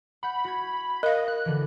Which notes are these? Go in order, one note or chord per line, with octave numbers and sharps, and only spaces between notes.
F#5 B5 G6
F#4 G#6
A#4 D#5 F5
F#6
D3 E3